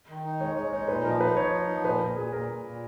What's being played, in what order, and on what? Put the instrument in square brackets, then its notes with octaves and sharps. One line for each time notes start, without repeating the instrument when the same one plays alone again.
[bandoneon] D#3
D#4
[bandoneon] G#3 [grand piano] C#5
[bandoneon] G#3 [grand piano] C#5
[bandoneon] D#4 [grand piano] C#5
[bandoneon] A#2 [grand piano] B4
[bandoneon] F3 [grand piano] A#4
[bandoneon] D#4 [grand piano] B4
[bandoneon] F3 [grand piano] C#5
[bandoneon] D#4
F3
[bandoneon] A#2 [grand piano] B4
[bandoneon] A#2 [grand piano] A#4
[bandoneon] A#2 [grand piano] G#4
[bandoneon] A#2 [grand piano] A#4
[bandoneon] A#2
A#2